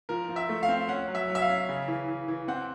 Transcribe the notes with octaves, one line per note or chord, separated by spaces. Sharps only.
F3 A#4
F3
E5
A3
F5
C4
C#4 F#5
F#3
E5
F#3
E5
F5
C#4
C#3
E3
E3
E3
C4 F#5